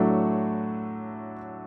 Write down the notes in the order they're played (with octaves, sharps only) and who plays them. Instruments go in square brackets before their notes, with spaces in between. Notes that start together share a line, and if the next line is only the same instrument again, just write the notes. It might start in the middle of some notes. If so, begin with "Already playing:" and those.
Already playing: [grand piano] A2 F#3 A3 D4 F#4